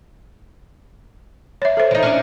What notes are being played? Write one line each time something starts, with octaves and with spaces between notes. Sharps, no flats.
C#5 E5
A4 C5
E3 D#4
C#4 D4 D5